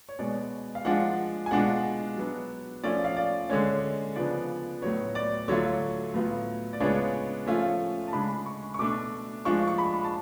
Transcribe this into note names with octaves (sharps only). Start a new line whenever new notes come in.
C#5
B2 G#3 B3 D5
F5
F3 G#3 D4 F4 F#5
G#5
B2 G#3 D4 F4 F#5
F#3 B3 D4
F3 A3 C#4 F4 D5
F5
D5
D3 G#3 C#4 C#5
C#3 F3 B3 D4 D5
A2 F#3 B3 C#5
D5
D3 F#3 A3 F4 C#5
A2 F#3 B3 F4
D5
C#3 G#3 B3 D4 F4 C#5
F3 A3 C#4 F4
A5
C#3 G#3 D4 B5
C#6
C#6
B2 A3 D4 D6
F3 G#3 D4 F4 C#6
C#6
B5
A5